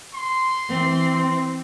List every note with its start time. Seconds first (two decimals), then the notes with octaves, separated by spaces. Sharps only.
0.14 C6
0.68 E3 C4